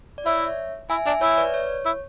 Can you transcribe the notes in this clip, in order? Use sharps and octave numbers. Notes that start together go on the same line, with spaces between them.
D5
E4 C#5 E5
E4 E5 G#5
D4 E5 G#5
E4 C#5 E5
B4 D5
C#5
E4